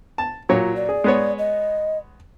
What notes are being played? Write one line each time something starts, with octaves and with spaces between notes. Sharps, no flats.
A5
A#2 F#3 F4 C#5
D5
G#4
G#3 B3 C#5
D#5